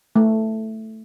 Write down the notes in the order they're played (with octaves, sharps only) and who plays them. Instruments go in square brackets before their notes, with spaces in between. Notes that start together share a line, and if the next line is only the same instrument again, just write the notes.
[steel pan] A3